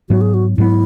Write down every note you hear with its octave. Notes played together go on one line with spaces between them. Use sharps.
G#2 F#3 B3 F#4
G#4
F#4
G#2 F#3 B3 E4